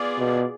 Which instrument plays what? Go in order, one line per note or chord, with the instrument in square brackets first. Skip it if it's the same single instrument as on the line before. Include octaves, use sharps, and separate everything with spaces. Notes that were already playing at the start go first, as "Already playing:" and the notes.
Already playing: [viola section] B3 F4 G#4 D5
[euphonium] B2